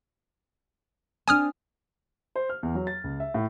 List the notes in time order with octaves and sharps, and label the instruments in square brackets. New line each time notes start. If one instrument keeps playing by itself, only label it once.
[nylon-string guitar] C4 D4 [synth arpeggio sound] G#5 D#6 F6
[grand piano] C5
F6
E2
F#3
A6
C#2
E5
A2